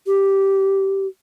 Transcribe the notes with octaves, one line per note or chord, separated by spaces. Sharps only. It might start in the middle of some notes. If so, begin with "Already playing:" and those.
G4